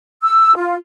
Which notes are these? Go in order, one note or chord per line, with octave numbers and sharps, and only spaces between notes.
E6
F4